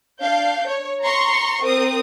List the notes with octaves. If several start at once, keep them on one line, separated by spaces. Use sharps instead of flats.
D4 F5 G6
C#5
A#5 C6 C#6
C4 A#4 D#6